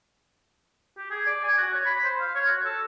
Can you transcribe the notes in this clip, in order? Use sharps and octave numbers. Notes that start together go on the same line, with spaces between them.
G4
G#4
D5
G#5
F#4
C#5
B5
C5
F5
C#5
F#4
A4